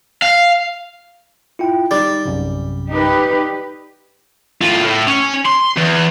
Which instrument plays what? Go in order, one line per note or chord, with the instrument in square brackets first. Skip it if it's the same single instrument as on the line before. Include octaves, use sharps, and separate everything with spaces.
[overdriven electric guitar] F5
[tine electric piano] E4 F4 G5
[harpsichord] G3 [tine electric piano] D#4 D6 A6
[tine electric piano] A#1 F#2 C3
[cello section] D#4 G4 B4
[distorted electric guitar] A2 F4
A2
C#4
C6
E2